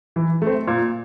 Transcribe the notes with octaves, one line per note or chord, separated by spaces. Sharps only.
E3
A3 C4
A#2